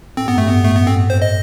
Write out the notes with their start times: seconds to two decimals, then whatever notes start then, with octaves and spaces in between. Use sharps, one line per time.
0.17 A2 C4
0.26 G2 B3
0.35 F#2
0.38 A3
0.44 G2
0.49 A2 B3
0.64 A2 A3
0.75 G2 B3
0.87 A2 C4
1.10 C5
1.22 D#5